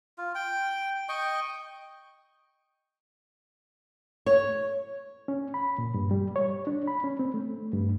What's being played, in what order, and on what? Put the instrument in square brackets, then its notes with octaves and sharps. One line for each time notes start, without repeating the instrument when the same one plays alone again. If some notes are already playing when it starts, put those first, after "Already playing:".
[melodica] F4
G5
D#5 G5 C#6
[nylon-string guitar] C#5
[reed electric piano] C#4
B5
A#2
G2
G3
C#5
D4
B5
C#4
C4
A3
G2